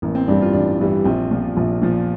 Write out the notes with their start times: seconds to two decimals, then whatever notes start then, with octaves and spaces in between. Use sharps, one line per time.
0.02 A1 A#3
0.15 C4
0.28 G2 E3 G3 D4
0.42 F4
0.53 A1 D4
0.80 G2 E3 G3
1.04 A#1 C4
1.31 A#2 F3
1.57 A#1
1.82 A#2 F3